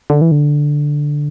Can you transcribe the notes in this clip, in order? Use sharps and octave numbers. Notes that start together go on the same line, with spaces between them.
D3
E3
D3